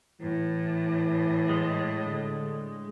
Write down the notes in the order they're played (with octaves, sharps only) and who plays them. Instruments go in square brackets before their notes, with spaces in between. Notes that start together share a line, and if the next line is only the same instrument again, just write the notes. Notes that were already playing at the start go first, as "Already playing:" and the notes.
[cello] A2 [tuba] E3
[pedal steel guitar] G#3
[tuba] D3